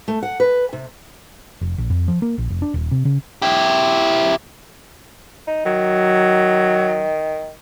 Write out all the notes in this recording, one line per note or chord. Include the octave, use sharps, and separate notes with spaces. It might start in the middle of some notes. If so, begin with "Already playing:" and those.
A3
F#5
B4
C3
F1
A#1
F2
F3
A#3
A#1
F1
D4
D#1
C3
C#3
E4 G4
D#4
D#3 F#3